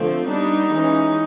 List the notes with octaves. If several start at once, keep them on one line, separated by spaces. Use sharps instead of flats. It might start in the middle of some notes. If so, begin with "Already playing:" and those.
Already playing: D3 F3 A3 C4
G3 B3 D4 D#4
E3 G#3 C#4